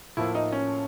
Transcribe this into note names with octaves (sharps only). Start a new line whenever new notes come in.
A2 F3 A#3 E4
D#4
C#4